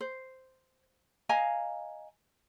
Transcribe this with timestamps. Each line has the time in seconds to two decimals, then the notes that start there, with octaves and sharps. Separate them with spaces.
0.01 C5
1.29 D#5 F5 G#5 A#5